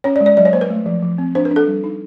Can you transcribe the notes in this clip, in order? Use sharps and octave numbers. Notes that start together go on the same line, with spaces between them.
C#4 C#5
D5
G#3
D5
F#3 D5
C#5
A#3 C5
B4
A3
F3
F3
C4
D4 C5
B4
D4
A4
G3
D#4